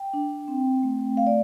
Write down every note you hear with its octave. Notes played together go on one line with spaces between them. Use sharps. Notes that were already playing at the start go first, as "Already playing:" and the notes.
Already playing: G5
D4
C4
A3
A3 F5
D5